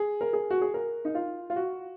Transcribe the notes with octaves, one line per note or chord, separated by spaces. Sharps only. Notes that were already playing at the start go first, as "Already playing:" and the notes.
Already playing: G#4
A#4
G#4
F#4
G#4
A#4
D#4
F4
F4
F#4